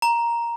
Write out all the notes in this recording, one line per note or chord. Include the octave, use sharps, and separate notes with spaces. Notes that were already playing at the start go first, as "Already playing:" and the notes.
A#5